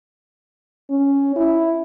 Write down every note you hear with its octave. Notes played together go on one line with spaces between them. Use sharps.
C#4
E4